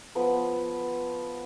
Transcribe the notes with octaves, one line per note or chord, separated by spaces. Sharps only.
F3 B3 B4